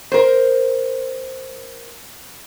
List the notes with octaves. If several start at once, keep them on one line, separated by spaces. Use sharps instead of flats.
A#4 C5